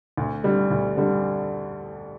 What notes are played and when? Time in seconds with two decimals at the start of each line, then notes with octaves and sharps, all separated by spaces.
0.17 D2
0.44 D3 G3
0.71 D2
0.97 D3 G3